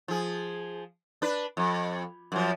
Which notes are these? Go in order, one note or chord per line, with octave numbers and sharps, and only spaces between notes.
F3 G#4
D4 B4
F2
F#2 F3